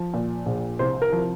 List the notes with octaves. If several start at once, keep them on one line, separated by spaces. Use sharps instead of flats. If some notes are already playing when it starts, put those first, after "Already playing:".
Already playing: F3
A#2
A#1
C2 C5
A#4
F3